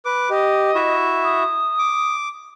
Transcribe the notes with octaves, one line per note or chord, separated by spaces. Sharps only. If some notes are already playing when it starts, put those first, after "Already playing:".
B4 D6
G4 D#5
E4 F#4 E5
D#6
D6